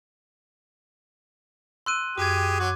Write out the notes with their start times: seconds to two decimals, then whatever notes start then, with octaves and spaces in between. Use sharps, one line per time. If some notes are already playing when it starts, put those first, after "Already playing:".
1.86 C6 E6 F#6 D#7
2.18 F#2 G4 G#4 D6 G#6
2.60 F#3 F#4 D6